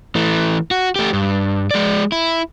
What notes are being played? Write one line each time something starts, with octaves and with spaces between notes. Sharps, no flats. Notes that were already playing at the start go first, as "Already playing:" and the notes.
E3 A3
F#4
A3 G4
G2
G#3 D5
E4